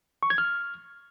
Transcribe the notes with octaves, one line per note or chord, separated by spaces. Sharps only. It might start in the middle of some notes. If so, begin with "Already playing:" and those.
C#6
G#6
F6